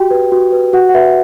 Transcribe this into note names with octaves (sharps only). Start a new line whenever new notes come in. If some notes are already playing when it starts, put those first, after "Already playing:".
Already playing: F#4 G4 G5
B4
F#4
B4
F#4 F#5
F#5
B4 E5